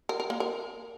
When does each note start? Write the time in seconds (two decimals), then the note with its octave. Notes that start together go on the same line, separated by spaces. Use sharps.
0.09 A#4
0.20 A#4
0.30 A#3
0.40 A#4